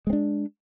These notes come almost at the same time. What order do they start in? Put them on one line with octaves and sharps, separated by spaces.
G#3 C4 D4